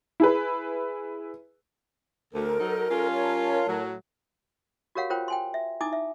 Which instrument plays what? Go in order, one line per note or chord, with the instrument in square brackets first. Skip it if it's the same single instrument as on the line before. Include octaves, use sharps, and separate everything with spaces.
[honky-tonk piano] E4 G#4 B4
[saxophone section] D2 [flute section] A4 A#4 C5
[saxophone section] F#3 D#4
G3 C#4 F4
[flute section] A#4 C#5 A5
[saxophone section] A2 F#3
[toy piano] F#4 G4 A#4 C#5 F5 F#5
F4 A#4 C5 C#5 G5
G5 G#5 C6
E5
D#4 E4 G#5 D6 D#6
E5